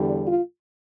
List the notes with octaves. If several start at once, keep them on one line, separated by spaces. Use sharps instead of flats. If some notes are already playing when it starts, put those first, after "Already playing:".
Already playing: E2 D3 G3
F4